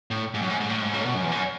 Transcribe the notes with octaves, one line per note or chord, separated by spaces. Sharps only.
A2
G#2
F#2
G#2
G#2
A2
G#2
C#3
A2
B2
F#2
E2
F#2